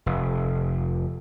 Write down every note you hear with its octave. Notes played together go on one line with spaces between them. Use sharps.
F1